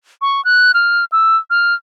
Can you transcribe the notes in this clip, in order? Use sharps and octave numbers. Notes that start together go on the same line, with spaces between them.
C#6
F#6
F6
E6
F6